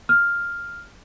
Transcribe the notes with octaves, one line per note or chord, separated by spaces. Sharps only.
F6